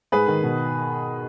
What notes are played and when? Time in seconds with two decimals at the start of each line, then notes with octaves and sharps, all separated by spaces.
0.12 G#2 G#4 B4
0.28 D#3
0.43 B2